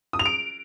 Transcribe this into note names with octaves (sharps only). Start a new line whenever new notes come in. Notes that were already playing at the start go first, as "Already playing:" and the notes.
D#6
F7
D7